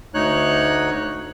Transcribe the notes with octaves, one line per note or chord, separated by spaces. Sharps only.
D2 D#4 C#5 F#6